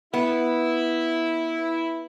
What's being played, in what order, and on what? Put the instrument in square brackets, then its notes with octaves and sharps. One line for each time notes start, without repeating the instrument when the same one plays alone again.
[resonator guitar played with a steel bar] B3 [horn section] E4